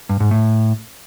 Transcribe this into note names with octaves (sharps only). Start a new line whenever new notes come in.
G2
G#2
A2